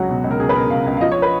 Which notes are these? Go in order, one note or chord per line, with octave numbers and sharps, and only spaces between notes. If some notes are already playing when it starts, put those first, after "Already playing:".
Already playing: C#2 F#3 F#4
B2
C#2
A#4
C#2 G#4
B4
B2 A#4
C#2 F5
C#2
F5
F3 D#5
C#5
B4